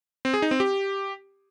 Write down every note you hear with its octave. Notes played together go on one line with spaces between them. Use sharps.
C4
G#4
D#4
C4
G4